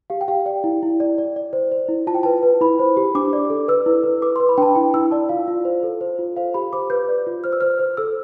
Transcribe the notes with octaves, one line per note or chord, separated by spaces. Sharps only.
G4 F5
G5
G4 F5
D5 G5
E4
E4
D5
D5
D5
C5
C5
E4
F4 A5
G5
B4 A5
B4
E4 B5
C5
G4
D4 D6
D5
A4
B4 E6
E4
B4
B4 D6
B4 C6
B5
D4 G5 A5
E4 G5
E4 E6
D5 A5
F4 F5
F4
C5
A4
C5
F4
C5 F5
G4 B5
C5 D6
B4 G6
D5
F4
C5 F6
E6
C5 F6
C5
A4 E6